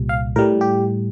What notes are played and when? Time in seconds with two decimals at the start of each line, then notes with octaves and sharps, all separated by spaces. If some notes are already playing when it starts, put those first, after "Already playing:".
Already playing: C2 A#2 G3
0.09 F5
0.36 A2 G3 A#4
0.61 G4